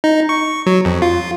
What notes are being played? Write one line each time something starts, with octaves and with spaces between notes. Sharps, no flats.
D#4
C#6
F#3
F2
F4